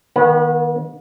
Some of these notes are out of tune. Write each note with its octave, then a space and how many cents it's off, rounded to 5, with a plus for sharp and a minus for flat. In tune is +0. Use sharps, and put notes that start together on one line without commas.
D#3 +0 B3 -40 F#5 +0